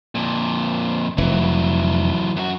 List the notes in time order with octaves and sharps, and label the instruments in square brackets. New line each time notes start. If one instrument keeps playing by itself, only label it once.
[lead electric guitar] F2 A#2
[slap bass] F1 [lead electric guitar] E3 F#3
[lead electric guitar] F#2 F#4